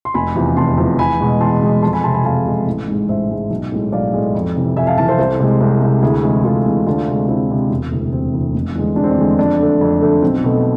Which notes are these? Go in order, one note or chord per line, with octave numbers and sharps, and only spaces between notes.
C6
F1 G#5 B5
E2 C3 F3
F1 A5 C6
E2 C3 F3
E2 G#5 B5
B2 G#3
E2 A5 C6
B2 G#3
F2 A5 C6
G#5 B5
C3 G#3 A5 C6
G#5 B5
F2 F5 A5
C3 G#3
A1
G#2 G#3
A1 C5 E5
G#2 G#3
B1
A2 G#3
B1 D5 F5
A2 G#3
F2
C3 E3
F2 E5 G#5
F5 A5
C3 E3 F5 A5
A4 C5
C2 A4 C5
C3 G#3
C2
C3 G#3
D2 E4 G#4
C3 E3 G#3
D2 F4 A4
C3 E3 G#3
D2 D4 F4
C3 G#3
D2 C4 E4
C3 G#3
E1
D2 C3 E3
E1 C4
D2 C3 E3
F1
E2 D3 G#3
F1 D4
C4
D4
E2 D3 G#3
F2 D4
D3 A3
F2
D3 A3
B1 C4
B2 A3